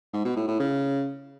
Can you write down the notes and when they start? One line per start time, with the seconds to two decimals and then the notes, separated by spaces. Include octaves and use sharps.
0.13 G#2
0.25 B2
0.36 A2
0.48 A2
0.60 C#3